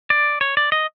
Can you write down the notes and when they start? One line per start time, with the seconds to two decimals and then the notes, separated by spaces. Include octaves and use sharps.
0.10 D5
0.41 C#5
0.57 D5
0.72 D#5